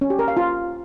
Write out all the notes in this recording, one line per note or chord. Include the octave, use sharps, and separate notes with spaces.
C#4
G4
A#4
F5
F4